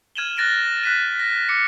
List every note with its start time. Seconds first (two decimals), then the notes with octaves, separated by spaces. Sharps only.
0.15 F6 G#6 D#7 E7 F#7 G7
0.37 F6 F#6 A6 A#6 D7 G7
0.83 F#6 B6 D#7
1.19 A#6
1.49 D6 C#7